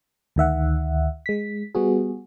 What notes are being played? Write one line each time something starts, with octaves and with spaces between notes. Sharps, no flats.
D2 D#3 E5 F#5
G#3 B6
G3 B3 F#4 G#4